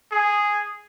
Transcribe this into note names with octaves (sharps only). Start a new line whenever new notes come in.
G#4